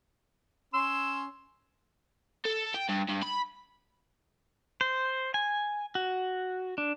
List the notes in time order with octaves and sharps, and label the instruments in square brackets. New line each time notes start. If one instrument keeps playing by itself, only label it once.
[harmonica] C#4 C6 [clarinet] E6
[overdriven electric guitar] A4
G5
G2
G2
B5
[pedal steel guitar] C5
G#5
F#4
D4